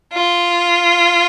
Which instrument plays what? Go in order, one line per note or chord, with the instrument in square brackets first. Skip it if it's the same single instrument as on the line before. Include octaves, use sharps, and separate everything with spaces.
[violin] F4